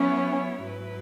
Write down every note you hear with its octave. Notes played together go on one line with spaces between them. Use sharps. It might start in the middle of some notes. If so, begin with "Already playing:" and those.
Already playing: F#3 B3 C#4 E4 C#5
G#2 F#3 E4 B4